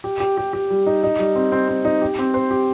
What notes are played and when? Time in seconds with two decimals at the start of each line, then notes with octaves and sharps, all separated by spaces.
0.04 G4
0.20 G4
0.37 G4
0.53 G4
0.70 G3
0.86 D#4
1.03 D#4
1.19 G3
1.35 C4
1.52 C4
1.69 C4
1.85 D#4
2.02 G4
2.19 C4
2.34 C5
2.51 G4